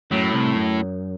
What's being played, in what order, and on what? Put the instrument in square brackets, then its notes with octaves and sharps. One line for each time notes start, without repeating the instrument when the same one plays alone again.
[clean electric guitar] F#2 F#3 [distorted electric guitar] A2
[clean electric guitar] C2 C3
F#2